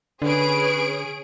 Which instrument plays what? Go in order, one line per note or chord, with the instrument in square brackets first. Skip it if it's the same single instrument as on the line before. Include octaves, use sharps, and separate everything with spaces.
[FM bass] D3 [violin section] C#4 G#4 D7 [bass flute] B4